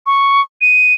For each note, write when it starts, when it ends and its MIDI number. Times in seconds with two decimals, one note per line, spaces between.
0.06 0.41 85
0.61 0.94 99